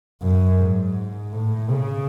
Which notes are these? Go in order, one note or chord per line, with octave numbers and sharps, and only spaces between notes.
F#2
G#2
A2
C#3